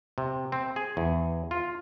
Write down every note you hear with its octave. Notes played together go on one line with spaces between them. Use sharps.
C3
C4
G#4
E2
F4